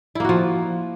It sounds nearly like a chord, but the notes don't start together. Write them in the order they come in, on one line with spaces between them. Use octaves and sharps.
E4 A#3 F#4 F3